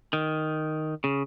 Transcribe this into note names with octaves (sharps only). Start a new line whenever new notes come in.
D#3
C#3